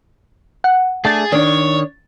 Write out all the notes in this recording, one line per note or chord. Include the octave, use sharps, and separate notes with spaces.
F#5
A3 D4 G#4 A6
D#3 D4 C#5 D5